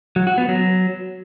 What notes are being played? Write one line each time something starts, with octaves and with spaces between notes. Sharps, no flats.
F#3
F#4
B3
F#3